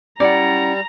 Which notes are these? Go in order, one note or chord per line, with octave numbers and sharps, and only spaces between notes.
G3 C#4 E4 D5 F#5 A#5